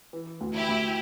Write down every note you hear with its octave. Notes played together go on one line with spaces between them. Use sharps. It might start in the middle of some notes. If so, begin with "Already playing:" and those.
E3
D2
E4 G4
D2